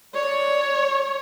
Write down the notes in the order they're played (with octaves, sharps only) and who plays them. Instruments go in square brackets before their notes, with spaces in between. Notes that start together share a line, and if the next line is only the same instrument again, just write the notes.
[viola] C#5 [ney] D5